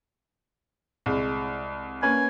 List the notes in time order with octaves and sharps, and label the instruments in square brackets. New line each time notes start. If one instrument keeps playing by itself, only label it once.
[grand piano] C2 G#3
[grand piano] A#3 C#4 B4 [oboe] G#5